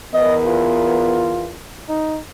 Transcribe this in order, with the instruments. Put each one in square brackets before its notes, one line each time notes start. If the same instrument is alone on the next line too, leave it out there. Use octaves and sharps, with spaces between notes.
[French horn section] E2 B3 A#4 [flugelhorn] D#5
[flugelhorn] F4
D#4